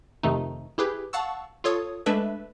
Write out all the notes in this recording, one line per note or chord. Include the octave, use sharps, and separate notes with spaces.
F2 C3 D#3 A3 D#4
E4 G4 G#4 B4
F5 F#5 A5 C#6 E6
F4 A4 C#5 D#6
G#3 A3 D4 A4 B4 E5